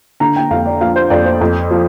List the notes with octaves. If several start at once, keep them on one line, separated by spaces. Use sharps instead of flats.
D3 A#5
G5
F2 F5
D5
F3 F5
C5
F2 D5
C5
F2
F3